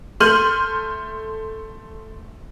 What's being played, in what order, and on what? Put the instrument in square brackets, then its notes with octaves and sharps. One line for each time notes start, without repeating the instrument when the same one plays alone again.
[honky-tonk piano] A3 C6 F6 G6 D#7 F#7